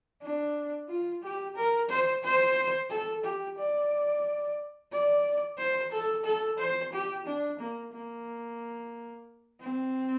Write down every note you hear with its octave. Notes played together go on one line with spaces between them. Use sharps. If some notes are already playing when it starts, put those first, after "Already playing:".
D4
F4
G4
A#4
C5
C5
A4
G4
D5
D5
C5
A4
A4
C5
G4
D4
A#3
A#3
C4